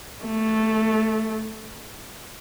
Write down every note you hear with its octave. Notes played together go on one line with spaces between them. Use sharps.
A3